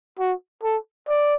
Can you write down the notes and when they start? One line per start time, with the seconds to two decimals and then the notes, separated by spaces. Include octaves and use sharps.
0.19 F#4
0.63 A4
1.08 D5